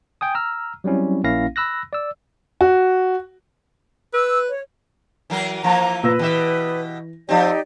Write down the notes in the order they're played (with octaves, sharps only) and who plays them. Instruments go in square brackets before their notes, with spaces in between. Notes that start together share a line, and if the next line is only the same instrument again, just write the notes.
[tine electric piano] G5 G#5 D#6
A#5 E6 F6
F#3 G3 C4 C#4 E4
A#1 A#3 C#4 E4 F5 A#6
B5 E6 F#6 A#6
D5 E6
[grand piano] F#4
[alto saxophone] B4 [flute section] E6
[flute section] C#5
[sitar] E3 F#3 A#4
[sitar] E3 F3 A#3 [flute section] A#5
[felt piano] A#2 E6 A#6 [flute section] B4
[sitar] B2 G4 E5 [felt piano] E3
[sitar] F3 C4 [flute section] D#4 G4 D5